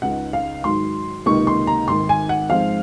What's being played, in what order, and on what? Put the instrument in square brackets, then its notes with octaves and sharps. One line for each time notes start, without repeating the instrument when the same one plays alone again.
[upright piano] C#2 C#3 G#3 D#4 F#5
F5
G#2 D#3 F#3 C6
C#2 C3 D#3 A#3 D#4 C#6
C6
A#5
G#1 G#2 D#3 C6
G#5
F#5
G#2 F3 G#3 C4 F4 F5